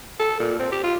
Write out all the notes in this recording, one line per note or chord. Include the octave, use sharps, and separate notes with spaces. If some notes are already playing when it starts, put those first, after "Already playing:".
A4
A#2
C4
G4
F4